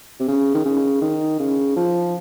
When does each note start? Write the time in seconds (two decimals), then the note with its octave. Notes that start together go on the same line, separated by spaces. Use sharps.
0.20 C3
0.28 C#3
0.55 D#3
0.65 C#3
1.02 D#3
1.39 C#3
1.76 F3